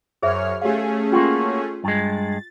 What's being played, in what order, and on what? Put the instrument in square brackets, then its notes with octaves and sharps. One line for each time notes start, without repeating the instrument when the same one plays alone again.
[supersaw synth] F#2 C#5 F6 [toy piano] G#4 C5 E5
[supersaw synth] A3 C#4 G#4 [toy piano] G4 F5
[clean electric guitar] A#3 F#4 [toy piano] F4 G5 C6
[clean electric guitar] G2 G#3 [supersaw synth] A6